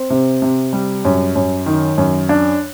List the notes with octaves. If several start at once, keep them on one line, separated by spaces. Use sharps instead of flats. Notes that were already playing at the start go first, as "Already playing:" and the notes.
Already playing: C4
C3
C3
G3
F#2
F#2
D#3
F#2
D4